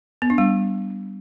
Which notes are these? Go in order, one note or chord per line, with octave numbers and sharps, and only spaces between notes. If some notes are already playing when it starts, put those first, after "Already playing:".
B3
D4
G3